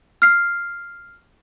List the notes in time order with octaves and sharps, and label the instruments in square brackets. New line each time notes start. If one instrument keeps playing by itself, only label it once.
[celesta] F6 C7